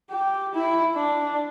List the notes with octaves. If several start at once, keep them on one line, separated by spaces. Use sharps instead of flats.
G4
E4
D4